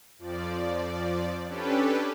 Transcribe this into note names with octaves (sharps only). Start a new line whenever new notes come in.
F2 F3 D5
C#4 D4 G4 A4 B4